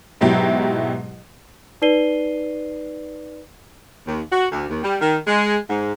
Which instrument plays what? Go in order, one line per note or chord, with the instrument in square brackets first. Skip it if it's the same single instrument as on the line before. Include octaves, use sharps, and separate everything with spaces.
[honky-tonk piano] G#2 B2 F#3 E4 G4
[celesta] D#4 B4 D5 C7 D#7 G7
[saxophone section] D#2
F#4
D2
D#2
G3
D#3
G#3
G#2